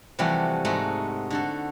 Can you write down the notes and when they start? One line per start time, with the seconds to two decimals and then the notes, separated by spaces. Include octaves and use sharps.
0.19 C3 E3 F3 G3 A3 F#4
0.65 G#2 G#3 A3 D#4 F#4
1.30 D3 F#4 A4